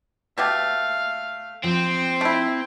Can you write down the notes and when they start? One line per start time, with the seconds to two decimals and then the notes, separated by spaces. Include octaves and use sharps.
0.38 B2 A3 G4 F5
1.64 F3 C4 C5 G5
2.21 A3 E4